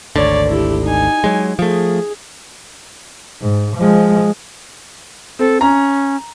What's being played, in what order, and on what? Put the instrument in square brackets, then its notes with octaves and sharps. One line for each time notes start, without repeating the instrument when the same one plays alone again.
[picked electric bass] G#1 D2 D3 [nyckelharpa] C#5 D5
[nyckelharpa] E4 G4
D#4 G#5
[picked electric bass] F#3 G#3
[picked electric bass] F3 A3 [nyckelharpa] G#4
[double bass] G#2
F3 G#3
[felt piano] C4 [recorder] A4
[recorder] C#4 [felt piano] A#5